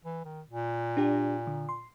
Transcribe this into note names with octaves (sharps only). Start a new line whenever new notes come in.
E3
D#3
A#2
D4 G4
D3
C6